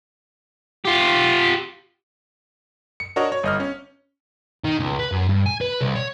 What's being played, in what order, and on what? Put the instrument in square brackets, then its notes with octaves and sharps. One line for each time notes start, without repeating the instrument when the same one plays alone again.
[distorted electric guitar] F4 G4
[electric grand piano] C#7
D4 F#4 A#4 C#5 D#5
C#5
G1 D#5 F6
C#4
[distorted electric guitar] D#3
C#2
B4
F#2
G2
G#5
B4
C2
C#5